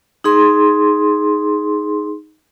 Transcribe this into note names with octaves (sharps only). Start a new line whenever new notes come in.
D#4 G#4 C6